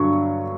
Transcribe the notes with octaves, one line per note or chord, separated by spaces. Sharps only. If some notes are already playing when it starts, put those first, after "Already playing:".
Already playing: G2 D3 F#3 C#6